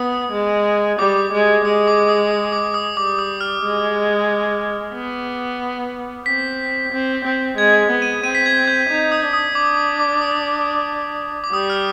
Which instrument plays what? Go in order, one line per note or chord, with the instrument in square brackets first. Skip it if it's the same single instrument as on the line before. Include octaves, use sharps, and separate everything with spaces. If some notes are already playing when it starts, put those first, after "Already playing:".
Already playing: [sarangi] B3 [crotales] D#6
[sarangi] G#3
[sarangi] G3 [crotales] D6
[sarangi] G#3
[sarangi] G#3 [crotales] D#6
[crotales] D6
D#6
D#6
D6
D#6
[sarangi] G3 [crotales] D6
[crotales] D#6
F6
[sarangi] G#3
B3
[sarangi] C4 [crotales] B6
[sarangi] C4
C4
[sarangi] G#3 [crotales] G#6
[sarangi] B3
[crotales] D#7
[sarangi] C4 [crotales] D#7
[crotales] B6
G#6
G6
[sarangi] D#4
[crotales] D#6
[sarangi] D4
[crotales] D#6
[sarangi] D4 [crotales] D6
[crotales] D6
D6
D#6
D6
[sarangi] G3 [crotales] D#6
[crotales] F6